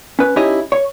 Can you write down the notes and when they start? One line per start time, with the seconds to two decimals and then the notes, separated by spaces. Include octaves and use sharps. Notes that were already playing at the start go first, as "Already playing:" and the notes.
0.19 C#4 B4
0.36 C#4 D#4 E4 G4 C#5 D#5
0.72 C#5